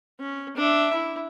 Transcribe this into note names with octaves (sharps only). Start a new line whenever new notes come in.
C#4
D4 E5
E4